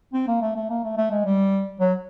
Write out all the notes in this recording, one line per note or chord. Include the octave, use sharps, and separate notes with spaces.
C4
A#3
A3
A3
A#3
A3
A3
G#3
G3
F#3